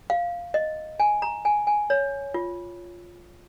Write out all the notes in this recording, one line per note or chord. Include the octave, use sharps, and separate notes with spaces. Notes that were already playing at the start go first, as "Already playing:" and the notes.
F5
D#5
G#5
A#5
G#5
G#5
C#5
F4